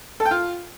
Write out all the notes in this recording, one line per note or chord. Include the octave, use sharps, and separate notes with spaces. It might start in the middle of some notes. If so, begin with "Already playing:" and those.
A4
G5
F4